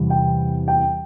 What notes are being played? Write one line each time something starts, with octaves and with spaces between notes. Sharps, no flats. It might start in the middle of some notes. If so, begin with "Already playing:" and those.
Already playing: E2 C3 G3
G5
G5